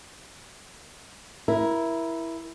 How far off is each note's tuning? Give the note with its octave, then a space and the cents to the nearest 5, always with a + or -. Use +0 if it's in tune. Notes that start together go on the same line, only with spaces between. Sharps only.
E4 +5 A#4 +25